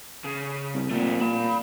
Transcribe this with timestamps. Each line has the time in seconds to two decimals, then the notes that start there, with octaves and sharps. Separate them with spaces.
0.24 C#3
0.75 C2
0.90 A#2 A3 C4
1.20 A#2 F5 B5